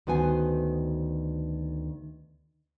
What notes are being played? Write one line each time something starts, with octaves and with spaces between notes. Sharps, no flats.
D2 D#3 B3 F#4 C5 G#5